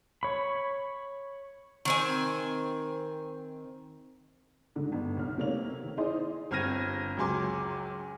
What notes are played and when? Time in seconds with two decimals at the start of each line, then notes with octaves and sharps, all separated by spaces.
0.23 C#5 B5
1.85 D#3 C4 G#5
4.76 G#2 D3
4.92 G1
5.17 B1 F6
5.38 C3 A3 A#3 C#5 F7
5.83 D#3
5.97 D#4 E4 G#4 C5 D5 D#5
6.51 G1 C4 F6 G#6 A#6 D#7
7.17 C#2 F#2 F#3 G#5 C6 D6